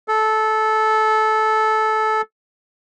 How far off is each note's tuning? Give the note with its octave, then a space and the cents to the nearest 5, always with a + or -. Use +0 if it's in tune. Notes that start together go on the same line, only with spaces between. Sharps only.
A4 -15